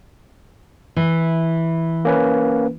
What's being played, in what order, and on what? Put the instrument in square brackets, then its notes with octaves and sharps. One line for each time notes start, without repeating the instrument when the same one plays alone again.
[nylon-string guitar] E3
[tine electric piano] A#3 C#4 B4